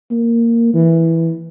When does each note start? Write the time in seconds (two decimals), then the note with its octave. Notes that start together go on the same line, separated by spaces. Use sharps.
0.11 A#3
0.74 E3